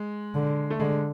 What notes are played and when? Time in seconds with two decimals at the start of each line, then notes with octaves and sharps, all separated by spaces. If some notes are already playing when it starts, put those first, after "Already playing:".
Already playing: G#3
0.35 D3
0.70 A3
0.80 D3 G#3